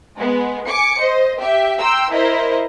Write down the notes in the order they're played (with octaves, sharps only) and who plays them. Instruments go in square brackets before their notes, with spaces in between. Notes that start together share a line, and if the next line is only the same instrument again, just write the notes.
[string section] G#3 B3
G#5 D6 C#7
C5 D#5
G4 E5
G5 A#5 C6 E6
E4 A#4 C5 D#5